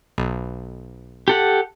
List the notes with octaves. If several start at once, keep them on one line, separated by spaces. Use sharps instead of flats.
B1
G4 A4 F#5